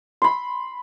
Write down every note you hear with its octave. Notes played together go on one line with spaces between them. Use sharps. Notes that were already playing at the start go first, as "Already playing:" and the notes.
B5 C6